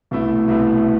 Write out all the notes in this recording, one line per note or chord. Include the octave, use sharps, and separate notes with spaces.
C2 B2 A3 E4
C2 B2 A3 E4